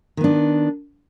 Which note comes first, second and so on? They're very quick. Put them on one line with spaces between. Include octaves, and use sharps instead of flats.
D#3 B3 D4